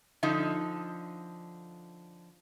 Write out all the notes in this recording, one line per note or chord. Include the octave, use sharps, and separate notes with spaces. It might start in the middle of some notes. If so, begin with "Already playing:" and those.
D3 F3 D#4